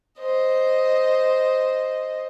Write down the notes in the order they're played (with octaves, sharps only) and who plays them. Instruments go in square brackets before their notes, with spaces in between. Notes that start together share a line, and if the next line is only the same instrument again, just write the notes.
[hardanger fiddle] C5 D#5